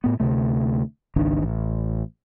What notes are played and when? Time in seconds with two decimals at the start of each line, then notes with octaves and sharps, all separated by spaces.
0.04 A2 B3
0.20 D2 C3 A3
1.16 G#1 C#2 D#3 D4
1.43 A1